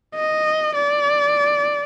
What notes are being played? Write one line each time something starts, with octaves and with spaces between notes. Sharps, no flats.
D#5
D5